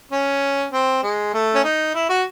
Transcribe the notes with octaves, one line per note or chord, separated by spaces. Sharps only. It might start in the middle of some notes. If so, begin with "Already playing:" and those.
C#4
C4
G#3
A3
C#4
D#4
E4
F#4